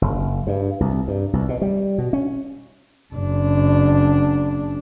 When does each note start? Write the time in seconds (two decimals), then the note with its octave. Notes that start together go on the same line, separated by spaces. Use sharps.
0.02 F#1
0.47 G2
0.80 C2
1.08 G2
1.33 C2
1.49 B2
1.62 G3
1.98 B2
2.13 C#4
3.14 F#1 D4